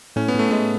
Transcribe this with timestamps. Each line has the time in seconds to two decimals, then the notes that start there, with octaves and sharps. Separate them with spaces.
0.16 A2 C#4
0.28 B3
0.34 A2 A3
0.51 G#3 B3